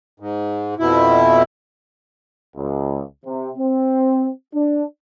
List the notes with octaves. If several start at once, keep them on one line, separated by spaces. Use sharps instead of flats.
G#2
F2 B2 E4
C#2
C3
C4
D4